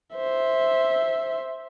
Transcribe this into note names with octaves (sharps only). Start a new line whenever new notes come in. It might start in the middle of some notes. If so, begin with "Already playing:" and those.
C5 E5